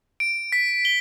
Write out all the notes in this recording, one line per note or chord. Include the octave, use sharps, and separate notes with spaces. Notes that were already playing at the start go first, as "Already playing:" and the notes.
D7
B6
G7